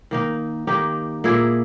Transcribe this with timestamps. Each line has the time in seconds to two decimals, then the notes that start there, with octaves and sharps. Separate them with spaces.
0.11 D#3 A#3 D#4
0.67 D#3 A#3 D#4 G4
1.24 A#2 A#3 E4 G#4